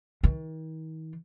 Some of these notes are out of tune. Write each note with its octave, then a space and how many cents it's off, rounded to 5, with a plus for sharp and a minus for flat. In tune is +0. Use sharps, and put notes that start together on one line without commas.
D#3 +40